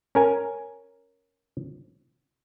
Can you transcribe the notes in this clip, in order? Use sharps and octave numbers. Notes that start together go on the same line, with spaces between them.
C#4 A#4 G#5